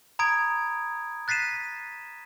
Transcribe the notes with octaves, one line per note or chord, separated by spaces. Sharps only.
A#5 B5 D#6 G#6 D7
F#6 A6 B6 C7 D#7 E7